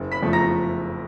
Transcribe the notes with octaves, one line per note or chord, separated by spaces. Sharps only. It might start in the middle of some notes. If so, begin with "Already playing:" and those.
Already playing: F#1
B5 B6
F2 C#3 F3 A3
A#5 A#6